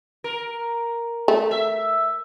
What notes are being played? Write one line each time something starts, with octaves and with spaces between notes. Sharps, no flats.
A#4
A3
E5